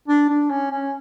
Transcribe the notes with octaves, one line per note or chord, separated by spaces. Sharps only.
D4
D4
C#4
C#4